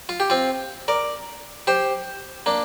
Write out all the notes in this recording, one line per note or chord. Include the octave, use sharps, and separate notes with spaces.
F4
G4
C4 F4
A#4 D5
G4 C5
A#3 D4